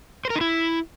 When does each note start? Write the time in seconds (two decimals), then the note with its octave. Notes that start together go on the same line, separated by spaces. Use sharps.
0.25 C5
0.30 A#4
0.36 D#4
0.41 E4